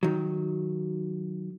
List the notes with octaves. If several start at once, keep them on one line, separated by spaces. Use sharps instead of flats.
D#3 F#3